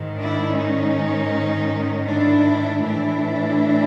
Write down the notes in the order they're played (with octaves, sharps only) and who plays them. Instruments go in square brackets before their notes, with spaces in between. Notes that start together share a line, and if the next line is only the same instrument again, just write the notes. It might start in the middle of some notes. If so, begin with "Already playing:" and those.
Already playing: [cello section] G#2 D#3
D4 E4
C#4 D#4
D4 E4
A2 E3 D4 E4